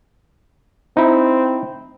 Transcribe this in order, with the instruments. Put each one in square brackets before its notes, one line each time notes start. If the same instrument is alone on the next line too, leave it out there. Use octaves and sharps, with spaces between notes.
[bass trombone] C4 [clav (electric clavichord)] D#4 E4